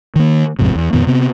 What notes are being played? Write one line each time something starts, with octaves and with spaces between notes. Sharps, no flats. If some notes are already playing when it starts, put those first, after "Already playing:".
D#3 A#3
A1 F2 G#2 C3
E2
F2 A#2 D#3 B3
C3 B3 C4